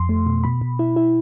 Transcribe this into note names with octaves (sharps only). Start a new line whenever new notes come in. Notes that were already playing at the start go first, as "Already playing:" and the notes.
Already playing: F2 C6
A3
B2
B2 B5
B2
E4
E4